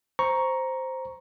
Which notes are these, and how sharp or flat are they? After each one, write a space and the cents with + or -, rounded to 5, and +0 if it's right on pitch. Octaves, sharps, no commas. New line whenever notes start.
C5 +0 A#5 +10 C#6 +0